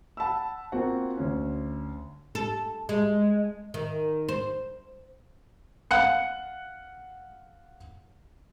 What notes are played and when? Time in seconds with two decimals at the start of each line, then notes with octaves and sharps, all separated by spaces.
0.17 F#5 A5 B5 E6
0.72 A#3 C4 F4 F#4 F#5
1.17 D2 C#4
2.35 A4
2.89 G#3
3.74 D#3
4.28 C5
5.91 F5 F#5 F#6 C#7